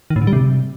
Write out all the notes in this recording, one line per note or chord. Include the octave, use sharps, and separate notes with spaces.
D#3
A2
D3
G3
C3